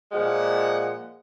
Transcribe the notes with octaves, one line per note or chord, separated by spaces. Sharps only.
A#2 F3 G#3 F#5